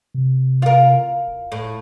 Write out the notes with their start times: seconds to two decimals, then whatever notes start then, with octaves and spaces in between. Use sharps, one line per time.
0.14 C3
0.62 F4 A#4
1.28 D#1
1.52 A2